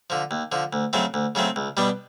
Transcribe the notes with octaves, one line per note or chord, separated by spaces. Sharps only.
D3 F3
D#2
D3 F3
D2
C#3 F#3 A3 C4
D2
C#3 F#3 A3 C4
C#2
B2 G3 B3 D4